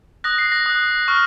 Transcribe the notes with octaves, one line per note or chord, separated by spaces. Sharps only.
D#6 F#6 A#6
C7
A#6
D#6 F#6
C#6 F6